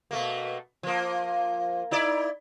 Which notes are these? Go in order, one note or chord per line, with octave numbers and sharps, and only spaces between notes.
B2 A3 A#3
F3 A#3
D#4 E4 D5